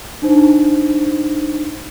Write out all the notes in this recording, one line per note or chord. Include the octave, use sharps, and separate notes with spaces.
D4 D#4 C5